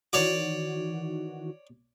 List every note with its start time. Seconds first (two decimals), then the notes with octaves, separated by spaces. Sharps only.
0.13 D#3 E3 F#4 C#5 D5 D6